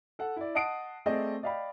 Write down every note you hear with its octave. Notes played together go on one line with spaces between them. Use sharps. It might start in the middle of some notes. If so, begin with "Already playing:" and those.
A4 F#5
E4 D5
D#5 F#5 A5 D#6 C7 D7
A3 C4 G#4 D5 D#5
D5 D#5 F5 G5 B5